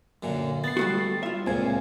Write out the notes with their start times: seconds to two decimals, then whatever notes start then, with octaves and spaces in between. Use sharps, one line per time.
0.23 F#2 A#2 D3
0.64 B3 A6 C7
0.77 G3 A3 F#4
1.23 F4 E5
1.47 C#2 A#2 C4 G#5